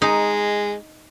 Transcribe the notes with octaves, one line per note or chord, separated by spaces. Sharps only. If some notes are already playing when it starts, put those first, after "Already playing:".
G#3 D#4